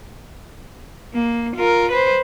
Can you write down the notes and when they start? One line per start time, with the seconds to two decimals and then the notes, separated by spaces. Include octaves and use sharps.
1.14 A#3
1.56 F4 A#4
1.92 B4 C5